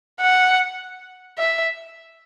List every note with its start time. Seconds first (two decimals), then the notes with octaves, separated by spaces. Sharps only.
0.21 F#5
1.38 E5